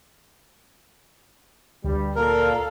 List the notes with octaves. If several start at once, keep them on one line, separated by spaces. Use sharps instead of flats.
D2 G2 G3
A#2 A4 A#4 F5